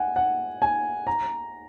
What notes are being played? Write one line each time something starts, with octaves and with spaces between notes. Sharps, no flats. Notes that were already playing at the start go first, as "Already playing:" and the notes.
Already playing: F#5 G#5
F#5
G#5
A#5